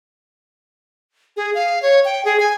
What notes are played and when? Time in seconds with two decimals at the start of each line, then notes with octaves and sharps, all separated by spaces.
1.37 G#4
1.55 F5
1.82 C#5
2.05 G5
2.25 G#4
2.40 G#5